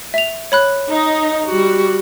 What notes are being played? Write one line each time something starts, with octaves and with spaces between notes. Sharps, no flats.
E5 F7
C#5 B5 F#6
D#4 D#5
G3 F#4